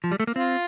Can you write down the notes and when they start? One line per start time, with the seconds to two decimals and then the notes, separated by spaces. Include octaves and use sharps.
0.04 F3
0.12 G3
0.20 A3
0.27 A#3
0.36 C4 F4